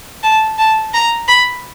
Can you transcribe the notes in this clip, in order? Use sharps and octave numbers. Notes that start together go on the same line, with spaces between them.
A5
A5
A#5
B5